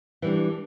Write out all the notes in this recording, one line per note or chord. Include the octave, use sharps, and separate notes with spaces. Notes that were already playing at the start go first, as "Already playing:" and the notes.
E3 G3 D4